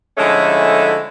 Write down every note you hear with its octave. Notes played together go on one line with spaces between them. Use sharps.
D3 F3 G#3 A3 C#4 E4